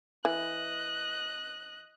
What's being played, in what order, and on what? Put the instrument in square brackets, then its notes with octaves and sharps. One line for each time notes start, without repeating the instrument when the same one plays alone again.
[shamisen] E3 [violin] D#5 F#6